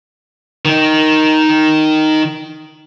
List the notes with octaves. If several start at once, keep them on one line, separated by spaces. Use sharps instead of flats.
D#3 D#4